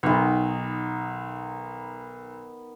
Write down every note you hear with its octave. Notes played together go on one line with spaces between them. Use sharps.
B1 D#3 B3